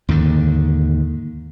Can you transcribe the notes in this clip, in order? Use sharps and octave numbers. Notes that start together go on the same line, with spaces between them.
D#2 G#2 D3